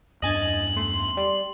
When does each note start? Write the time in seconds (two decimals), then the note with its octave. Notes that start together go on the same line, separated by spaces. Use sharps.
0.22 E2 G2 D4 D#5 G#5 A6 F#7
0.76 A3 C6
1.17 G3